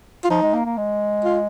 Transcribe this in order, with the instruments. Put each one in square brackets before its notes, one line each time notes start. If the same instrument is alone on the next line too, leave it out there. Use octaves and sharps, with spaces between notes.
[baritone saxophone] F4
[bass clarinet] F3 [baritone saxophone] D#4
[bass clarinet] G#3
A#3
A#3
G#3
[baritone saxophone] F4